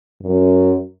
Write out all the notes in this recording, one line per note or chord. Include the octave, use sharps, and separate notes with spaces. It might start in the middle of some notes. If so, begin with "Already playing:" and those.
F#2